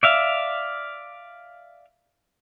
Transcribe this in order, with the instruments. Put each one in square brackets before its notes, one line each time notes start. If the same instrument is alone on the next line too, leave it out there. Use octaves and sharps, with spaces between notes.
[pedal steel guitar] D5 E5 F5